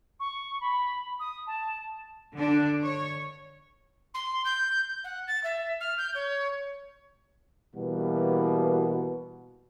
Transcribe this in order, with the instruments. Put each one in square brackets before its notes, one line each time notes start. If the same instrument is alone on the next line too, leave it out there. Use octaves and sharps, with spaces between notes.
[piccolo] C#6
B5
D#6
A5
[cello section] D3 D4
C#5
[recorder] C6
G6
F#5
A6
E5
F6
G6
C#5
[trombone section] B2 E3 G3 A#3 F#4 B4